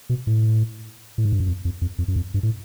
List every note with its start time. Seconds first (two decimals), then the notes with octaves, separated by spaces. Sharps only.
0.09 B2
0.27 A2
1.18 A2
1.25 G#2
1.32 G2
1.40 F#2
1.47 F2
1.65 F2
1.81 F2
1.98 F2
2.08 F#2
2.16 F2
2.34 G2
2.43 A2